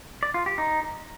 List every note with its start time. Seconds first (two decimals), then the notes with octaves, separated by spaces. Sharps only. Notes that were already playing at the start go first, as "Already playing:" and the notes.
0.23 D5
0.34 F4
0.46 G4
0.58 D#4